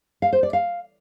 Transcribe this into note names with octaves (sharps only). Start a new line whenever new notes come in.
F5
C5
D5
F5